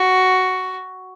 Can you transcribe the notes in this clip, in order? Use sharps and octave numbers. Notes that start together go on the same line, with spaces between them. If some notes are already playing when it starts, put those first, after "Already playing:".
Already playing: F#4